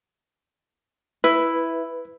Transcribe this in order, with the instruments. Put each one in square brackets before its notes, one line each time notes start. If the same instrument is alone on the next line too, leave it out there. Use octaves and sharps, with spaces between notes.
[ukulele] E4 [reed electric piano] B4